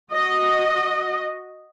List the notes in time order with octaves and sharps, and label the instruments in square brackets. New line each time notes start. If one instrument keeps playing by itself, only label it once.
[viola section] F#4 D#5